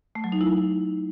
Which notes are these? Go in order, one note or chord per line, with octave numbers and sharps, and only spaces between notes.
A3
F#3
D#4
E4